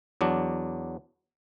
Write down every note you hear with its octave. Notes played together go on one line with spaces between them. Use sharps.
E2 F#3 D4